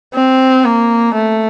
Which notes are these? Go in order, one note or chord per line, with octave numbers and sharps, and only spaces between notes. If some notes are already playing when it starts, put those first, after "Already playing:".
C4
A#3
A3